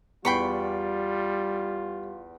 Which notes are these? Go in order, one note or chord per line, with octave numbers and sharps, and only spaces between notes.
E2 G3 F4 G5 B5 C#6 C7